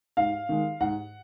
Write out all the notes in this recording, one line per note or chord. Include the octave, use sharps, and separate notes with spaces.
G#2 F5
D#3 G#3
G#2 F#5